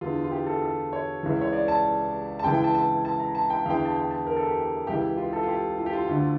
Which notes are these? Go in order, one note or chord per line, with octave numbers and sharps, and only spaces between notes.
E2 D3 F4
F4
G4
A4
A4
C#5
C#2 C#3 E3
C#5
D5
A5
A5
C#2 C#3 E3 G5
G5
A5
A5
A5
A#5
A5
G5
E2 D3 F5 G5
F5
A5
G5
A5
A#4
A4
G4
G4
C#2 C#3 E3 G4
F4
A4
F4
G4
F4
G4
F4
D2 D3 F4